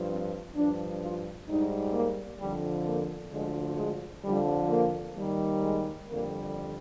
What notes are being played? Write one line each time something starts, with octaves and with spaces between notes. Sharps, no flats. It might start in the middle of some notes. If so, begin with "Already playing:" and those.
Already playing: G2 F3
C4
G2 F3 D4
F4
G#2 G3 D#4
A#3
F2 D3 F3 G3
A#3
D2 D3 F3 G#3
G#3
F2 D3 F3 G3
A#3
D#2 D#3 G3
G#3
F2 D3 G3 A#3